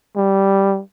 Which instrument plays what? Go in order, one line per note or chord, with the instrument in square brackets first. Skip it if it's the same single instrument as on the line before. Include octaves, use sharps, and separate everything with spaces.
[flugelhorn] G3